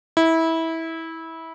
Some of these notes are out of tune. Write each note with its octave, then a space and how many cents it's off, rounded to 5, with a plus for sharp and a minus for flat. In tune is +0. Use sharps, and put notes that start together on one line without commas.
E4 -20